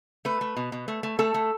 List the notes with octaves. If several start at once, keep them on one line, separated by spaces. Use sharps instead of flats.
A3 B4
A3
B2
B2
A3
A3
A3 A4
A3